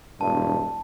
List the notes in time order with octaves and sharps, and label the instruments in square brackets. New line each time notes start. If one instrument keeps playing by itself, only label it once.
[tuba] E1 [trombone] G2 [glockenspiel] A5